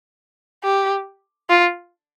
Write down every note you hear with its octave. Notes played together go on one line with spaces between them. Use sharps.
G4
F4